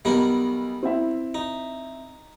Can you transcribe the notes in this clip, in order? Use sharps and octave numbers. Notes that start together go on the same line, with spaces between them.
B1 G3 B3 A#4
C4 E4 E5
D#4